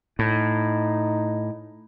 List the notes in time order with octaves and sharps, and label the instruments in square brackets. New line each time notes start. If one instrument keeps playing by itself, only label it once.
[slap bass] A2 [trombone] D#4